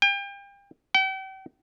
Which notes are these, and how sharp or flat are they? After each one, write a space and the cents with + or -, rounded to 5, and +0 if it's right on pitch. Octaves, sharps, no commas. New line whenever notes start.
G5 +35
G5 -40